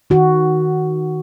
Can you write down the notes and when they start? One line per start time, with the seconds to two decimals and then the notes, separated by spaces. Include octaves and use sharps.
0.10 D#3 F#4